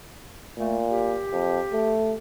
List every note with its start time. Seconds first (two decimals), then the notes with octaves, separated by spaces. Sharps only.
0.58 A#2 A3
0.90 G4
1.32 F2
1.73 A3